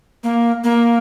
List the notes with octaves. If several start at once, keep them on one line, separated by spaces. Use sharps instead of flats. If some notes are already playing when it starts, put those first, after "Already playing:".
A#3
A#3